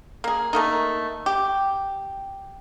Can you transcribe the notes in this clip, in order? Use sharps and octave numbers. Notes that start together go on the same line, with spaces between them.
A#3 G#4
A3 A#3 D#4
G4